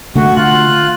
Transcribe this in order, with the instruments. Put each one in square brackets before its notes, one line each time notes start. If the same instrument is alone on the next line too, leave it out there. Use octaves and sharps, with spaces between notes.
[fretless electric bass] D3 A3 [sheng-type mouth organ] F#4
[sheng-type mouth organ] F4 F#6